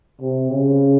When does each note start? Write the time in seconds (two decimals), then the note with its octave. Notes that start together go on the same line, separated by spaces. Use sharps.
0.21 C3
0.51 C#3